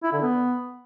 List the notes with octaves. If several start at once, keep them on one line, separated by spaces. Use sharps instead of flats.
E4
D3
B3